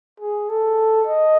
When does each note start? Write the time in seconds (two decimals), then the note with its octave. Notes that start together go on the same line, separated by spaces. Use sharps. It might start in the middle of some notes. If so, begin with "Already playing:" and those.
0.20 G#4
0.50 A4
1.07 D#5